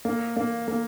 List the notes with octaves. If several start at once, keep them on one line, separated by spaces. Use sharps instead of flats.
A#3
A#3
A#3